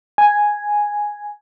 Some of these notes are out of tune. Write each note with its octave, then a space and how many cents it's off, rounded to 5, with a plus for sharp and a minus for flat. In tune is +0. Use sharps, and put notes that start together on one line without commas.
G#5 +0